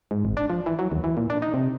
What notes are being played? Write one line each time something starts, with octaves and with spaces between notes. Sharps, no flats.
G#2
G#1
D4
F3
E3
F#3
D#2
E3
A#2
D4
D#4
C3